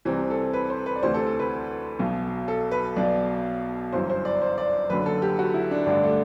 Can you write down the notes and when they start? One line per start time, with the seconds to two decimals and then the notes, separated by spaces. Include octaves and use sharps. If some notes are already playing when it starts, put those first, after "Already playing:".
0.05 C2 C3 E3 C4
0.30 A4
0.53 B4
0.70 C5
0.86 B4
0.96 D5
1.02 D2 C3 E3 C5
1.14 A4
1.26 A4
1.39 B4
1.99 B1 B2
2.48 A4
2.71 B4
2.96 B1 B2 D5
3.93 G1 F#2 E3 C5
4.10 C5
4.25 D5
4.42 C5
4.58 D5
4.90 F#1 F#2 D3 B4
5.06 A4
5.22 G4
5.39 F#4
5.54 E4
5.71 D4
5.86 A1 G2 D3 D4
6.03 A3